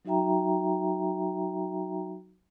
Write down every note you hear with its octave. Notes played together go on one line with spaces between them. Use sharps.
F#3 D#4 F#4 E5 G5 A#5